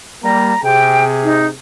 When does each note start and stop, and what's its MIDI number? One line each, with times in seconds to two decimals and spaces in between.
0.23 0.52 55
0.23 0.52 58
0.23 0.61 82
0.63 1.51 48
0.63 1.51 68
0.63 1.03 79
1.23 1.45 63